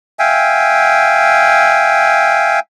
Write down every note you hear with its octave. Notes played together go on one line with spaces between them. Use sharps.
E5 F5 G5 G#5